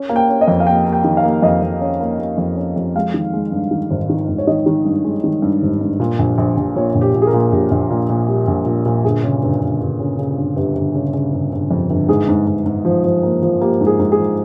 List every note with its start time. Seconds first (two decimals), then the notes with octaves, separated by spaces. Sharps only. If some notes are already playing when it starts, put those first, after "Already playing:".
Already playing: C#4
0.09 A#3
0.16 G5
0.29 C#4
0.41 D#5
0.48 F2
0.60 F5
0.67 A#3 G5
0.86 A#3
0.93 G5
1.04 D#3
1.17 F5
1.24 A#3
1.42 F2 D#5
1.62 F2
1.81 C#4
2.01 A#3
2.19 A#3
2.38 F2
2.57 C#4
2.76 F2
2.95 G#3 F5
3.14 D#3
3.33 G#3
3.52 G2
3.71 D#3
3.90 G#1
4.09 D#3
4.28 G#1
4.38 C#5
4.47 D#3 D#5
4.66 D#3
4.85 G2
5.04 G#3
5.24 D#3
5.42 G2
5.62 G#1
5.81 G2
6.00 A#2
6.19 A#1
6.38 A#1
6.57 A#1
6.76 A#2 C#5
6.95 A#1
7.01 G4
7.14 A#2
7.22 G#4
7.27 A#4
7.33 A#2
7.52 A#1 G4
7.71 A#1
7.90 A#2
8.09 A#2
8.28 G3
8.48 A#1
8.66 A#2
8.86 A#2
9.04 G1 G#4
9.24 C#3
9.43 G1
9.62 G1
9.80 G1
10.00 C#3
10.19 C#3
10.38 G1
10.56 G1 G4
10.75 G1
10.95 C#3
11.13 C#3
11.33 G1
11.52 G1
11.71 F2
11.90 G1
12.08 G#2 G#4
12.28 G#2
12.47 G#2
12.66 G#2
12.85 F3
13.04 F3
13.23 A#3
13.42 F3
13.61 A#3 G4
13.81 G#2
13.87 G#4
14.00 G#2
14.12 G#4
14.19 F3